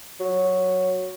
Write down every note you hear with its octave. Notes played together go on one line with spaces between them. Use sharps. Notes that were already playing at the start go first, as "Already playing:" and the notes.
F#3